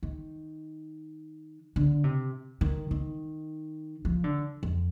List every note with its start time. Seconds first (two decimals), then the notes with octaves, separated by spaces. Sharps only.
0.03 D#3
1.76 D3
2.04 C3
2.61 D#3
2.91 D#3
4.05 F3
4.24 D3
4.63 F2